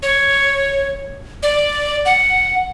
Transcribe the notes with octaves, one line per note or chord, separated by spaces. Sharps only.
C#5
D5
F#5